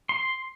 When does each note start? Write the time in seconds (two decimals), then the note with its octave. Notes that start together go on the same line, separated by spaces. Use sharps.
0.09 C6